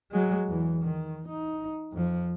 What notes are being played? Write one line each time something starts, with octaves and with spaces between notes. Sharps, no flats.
F#3 G#3
E2 E3
D#3
D#4
F2 F3